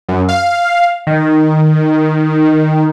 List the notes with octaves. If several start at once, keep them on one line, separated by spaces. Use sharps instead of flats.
F#2
F5
D#3